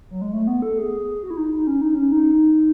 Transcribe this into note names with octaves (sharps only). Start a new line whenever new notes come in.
F#3
G#3
A3
B3
A4
G#4
F#4
E4
D#4
D#4
C#4
D#4
C#4
D#4